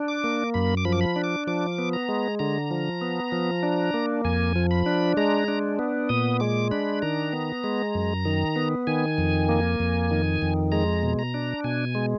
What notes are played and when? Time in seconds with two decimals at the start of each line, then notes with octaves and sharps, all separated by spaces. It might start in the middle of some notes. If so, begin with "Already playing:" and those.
Already playing: D4
0.08 D6
0.24 A#3
0.54 F#2 B5
0.77 D6
0.85 F3 B5
0.92 D6
1.01 B5
1.16 D4
1.24 D6
1.47 F3 D6
1.79 B3
1.93 A#5
2.09 G#3
2.39 D3 A#5
2.71 F3
3.01 B3
3.32 F3
3.63 D4
3.94 A#3
4.24 F2 G#5
4.56 F3
4.71 B5
4.86 D4
5.17 G#3 A#5
5.48 D4
5.79 B3
6.09 A#2 D#6
6.40 G#3 D6
6.71 D4 B5
7.02 D#3 A#5
7.33 B3
7.64 G#3
7.95 F#2
8.25 D#3
8.56 B3
8.87 D#3 G#5
9.18 F2
9.49 A#3
9.80 F2
10.11 D#3
10.42 F2
10.72 G#3 A#5
11.03 B2
11.19 A#5
11.34 D4
11.64 B2 G#5
11.95 G#3